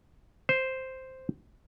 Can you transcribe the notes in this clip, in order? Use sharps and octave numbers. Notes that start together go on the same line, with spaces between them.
C5